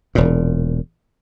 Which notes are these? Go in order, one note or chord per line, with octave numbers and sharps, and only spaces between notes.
E1 A#2